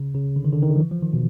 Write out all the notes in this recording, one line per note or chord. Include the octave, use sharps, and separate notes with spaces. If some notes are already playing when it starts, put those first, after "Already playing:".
Already playing: C#3
C#3
D3
D#3
D3
D#3
D3
F3
E3
F3
D#3
B2